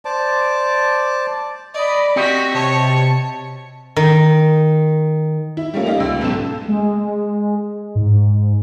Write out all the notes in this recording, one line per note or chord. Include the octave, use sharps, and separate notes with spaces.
C5 D5 A5 D6
D5 D#5 B5
C4 F#4 G4 D#5 A#6 B6 C#7
C3 C#5 A5 C#7
D#3
E4
G3 A3 A#3 C#4 F4
G3 D#4 D#5 F5
C#2 E6
B1 G#2 C#3 A4 E7
G#3
G#2